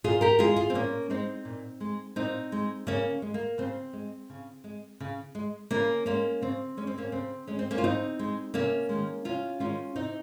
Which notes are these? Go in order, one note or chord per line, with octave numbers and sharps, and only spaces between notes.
A#2 F4 G#4
G4 A#4
G#3 F4 G#4
F4 G#4
C4
A#2 A#3 C#4
G#3 C4 D#4
A#2
G#3
A#2 C4 D#4
G#3
C#3 A#3 C#4
G#3
A#3
C#3 C4
G#3
C#3
G#3
C#3
G#3
C#3 A#3 C#4
G#3 A#3 C#4
C#3 C4
G#3 C#4
C4
A#3 C#4
C#3 C4
G#3 C#4
C4
A#3 C#4
F4
C#3 C4 D#4
G#3
C3 A#3 C#4
D#3 G#3
C3 C#4 F4
D#3 G#3 C#4 F4
C3 C4 D#4